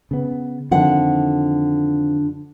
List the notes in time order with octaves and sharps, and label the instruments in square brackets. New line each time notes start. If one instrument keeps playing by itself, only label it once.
[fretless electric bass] C#3 B3
[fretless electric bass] F2 D#3 F3 [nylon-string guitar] D3 F#5